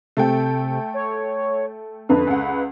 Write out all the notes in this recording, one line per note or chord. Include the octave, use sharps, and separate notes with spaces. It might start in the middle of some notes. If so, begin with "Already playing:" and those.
C3 A3 A4 G5
C#5
F2 D3 B4
C#2 F#5